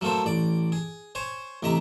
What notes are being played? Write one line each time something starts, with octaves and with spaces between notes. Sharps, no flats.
F#3 A3 A#3 A4 C5
A1 D5 D6
G#4
C5 C#5 G#5
A1 C3 D#5 E5 A#5